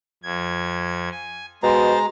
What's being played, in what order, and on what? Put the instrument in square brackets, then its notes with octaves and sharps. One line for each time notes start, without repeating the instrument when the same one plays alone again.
[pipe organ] F2 G#6
G#5
[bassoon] B2 [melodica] G#3 A#5 [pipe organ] C5 A6